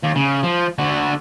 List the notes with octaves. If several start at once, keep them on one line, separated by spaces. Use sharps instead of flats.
D#2
C#3
F3
D3 F#4